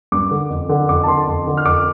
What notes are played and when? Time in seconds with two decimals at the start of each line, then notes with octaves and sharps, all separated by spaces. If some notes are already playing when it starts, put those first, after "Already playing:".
0.12 G2 D6
0.31 D3
0.50 F2
0.69 D3
0.89 F2 D6
1.04 A5
1.07 D3 C6
1.27 F2
1.47 D3
1.57 F6
1.66 F2 D6